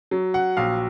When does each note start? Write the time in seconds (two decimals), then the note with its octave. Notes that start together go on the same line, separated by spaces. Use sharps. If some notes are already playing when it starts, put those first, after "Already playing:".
0.11 F#3
0.34 F#5
0.57 A#1 F5